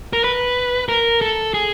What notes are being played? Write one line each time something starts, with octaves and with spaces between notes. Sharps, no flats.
A#4
B4
A#4
A4
G#4